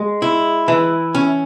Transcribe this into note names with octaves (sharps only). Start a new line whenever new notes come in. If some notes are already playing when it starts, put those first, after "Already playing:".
Already playing: G#3
E4
E3
C#4